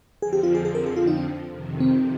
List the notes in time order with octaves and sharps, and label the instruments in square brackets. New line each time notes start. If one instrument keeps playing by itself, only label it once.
[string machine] F2 D3 F3 C4 [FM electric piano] G#4
[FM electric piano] G4
F4
G#4
G#4
A#4
G#4
F4
D#4
D4
[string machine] F2 C3 D#3
[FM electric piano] C4